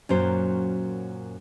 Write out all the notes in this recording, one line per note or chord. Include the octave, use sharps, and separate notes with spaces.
F#2 A#2 F#3 C#4 C5